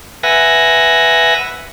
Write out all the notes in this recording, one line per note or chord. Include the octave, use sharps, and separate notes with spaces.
B4 E5 F#5 G#5 A#6